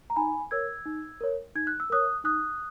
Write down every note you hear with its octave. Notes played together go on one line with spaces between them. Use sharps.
A#5
D#4 G#5 B5
A#4 C#5 E6 G#6
D#4
A#4 C#5
D#4 G#6
F#6
E6
A#4 C#5 D#6 F#6
D#4 D#6 F#6